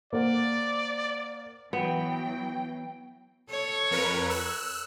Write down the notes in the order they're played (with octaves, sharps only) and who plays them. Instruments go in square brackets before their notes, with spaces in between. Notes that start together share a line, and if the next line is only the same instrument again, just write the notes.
[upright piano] A#3 C5 F#5 [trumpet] D5
[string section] E3 F#3 G5 [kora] B3
[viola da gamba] A4 C#5
[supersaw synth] F2 A#4 B4
E6 F#6